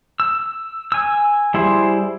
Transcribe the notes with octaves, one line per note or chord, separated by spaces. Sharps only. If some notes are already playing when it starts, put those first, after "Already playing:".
E6
G#5 E6
G3 E4 G#4 C5